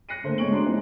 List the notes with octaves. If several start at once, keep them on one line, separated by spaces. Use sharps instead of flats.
F#6 A#6 C7 C#7 D#7
D3 A3 A#3 C5
G#3 C#5 C#6 D7 F#7
A3 D4 F#4 A#5 C6
E3 F3 G#3 C4 D#4 E4